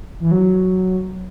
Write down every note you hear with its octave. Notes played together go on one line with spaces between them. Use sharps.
E3
F#3